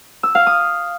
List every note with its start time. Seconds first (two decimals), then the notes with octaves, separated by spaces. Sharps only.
0.23 E6
0.35 F5
0.47 D#6